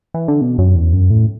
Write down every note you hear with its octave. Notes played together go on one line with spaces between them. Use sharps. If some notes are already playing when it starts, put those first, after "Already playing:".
E3
D3
B2
F#2
E2
F#2
A2